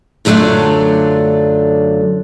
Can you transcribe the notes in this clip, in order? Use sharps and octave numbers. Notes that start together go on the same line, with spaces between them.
F#2 D3 F#3 A3 D4 F4